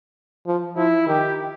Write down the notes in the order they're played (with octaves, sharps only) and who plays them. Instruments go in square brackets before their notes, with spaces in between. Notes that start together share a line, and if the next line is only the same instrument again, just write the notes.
[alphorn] F3
[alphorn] F3 [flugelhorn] E4
[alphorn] D#3 [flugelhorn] G4